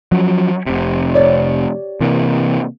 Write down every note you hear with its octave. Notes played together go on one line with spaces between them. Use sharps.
F3 F#3 C#4
F1 C3
G4 C#5 D5
C3 E3 A#3